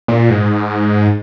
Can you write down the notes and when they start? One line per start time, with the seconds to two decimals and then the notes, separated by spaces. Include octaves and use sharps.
0.08 A#2
0.30 G#2